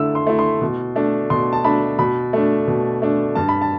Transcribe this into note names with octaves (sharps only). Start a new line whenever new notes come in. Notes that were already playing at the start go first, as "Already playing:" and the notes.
Already playing: D3 A3 E4 E6
C6
A3 E4
C6
B2
A3 D4
B2 C6
A5
A3 D4 B5
B2 B5
A3 D4
B2
A3 D4
G2 A5
B5
A5